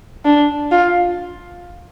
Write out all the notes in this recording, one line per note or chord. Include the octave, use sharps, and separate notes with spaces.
D4
F4